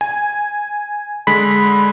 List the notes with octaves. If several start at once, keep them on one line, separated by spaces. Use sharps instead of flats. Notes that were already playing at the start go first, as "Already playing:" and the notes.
G#5
D3 G#3 B5